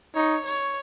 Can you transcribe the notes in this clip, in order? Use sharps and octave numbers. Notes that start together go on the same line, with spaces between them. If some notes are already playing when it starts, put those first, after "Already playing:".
D#4 C#5
C#5